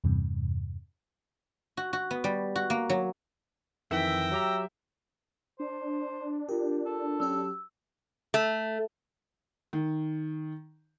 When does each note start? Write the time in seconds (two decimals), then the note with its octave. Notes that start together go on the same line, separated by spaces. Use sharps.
0.04 E2 G2 C3
1.77 F#4
1.93 F#4
2.11 B3
2.24 G3
2.56 F#4
2.70 A#3
2.90 F#3
3.91 F2 D#3 E3 E5 G5 A#6
4.32 F#3 G4 A#5
5.60 D4 C5
6.49 F4 G4 A#4
6.86 A4
7.20 F#3 C#4 G4 E6
8.34 A3
9.73 D#3